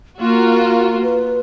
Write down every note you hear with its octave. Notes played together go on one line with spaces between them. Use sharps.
A#3 F4 F#4
B4